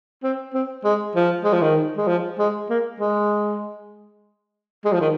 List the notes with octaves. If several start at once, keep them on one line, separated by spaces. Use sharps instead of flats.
C4
C4
G#3
F3
G#3
F3
D#3
G#3
F3
G#3
A#3
G#3
G#3
F3
D#3